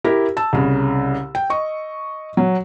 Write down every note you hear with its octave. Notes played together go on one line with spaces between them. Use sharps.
E4 G4 A#4
A5 E6
C2 C#3
G5
D#5 C#6
F#3